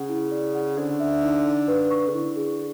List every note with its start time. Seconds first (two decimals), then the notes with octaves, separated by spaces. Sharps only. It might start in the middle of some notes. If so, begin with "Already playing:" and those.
Already playing: C#3 F#5
0.09 E4
0.31 D5
0.54 F#5
0.77 D3 C5
1.00 E5
1.23 D#4
1.46 D#4
1.68 B4
1.91 C#6
2.07 C#3
2.13 D3 E4
2.36 G#4